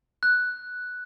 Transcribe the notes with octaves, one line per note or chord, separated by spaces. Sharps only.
F#6